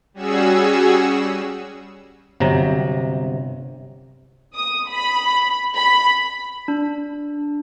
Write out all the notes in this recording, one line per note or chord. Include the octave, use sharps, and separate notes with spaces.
G3 C#4 F#4 G#4 E6
G1 C3 F#3 A#5
D#6
B5
B5
D4